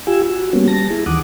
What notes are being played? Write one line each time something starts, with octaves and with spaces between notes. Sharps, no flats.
F4 G4 G#5 E6
F#4
G3 A#3 B3 C#4 F#4
G3 A5 A#6
E4 G#4
D#2 D#3 E3 F#5 D6 D#6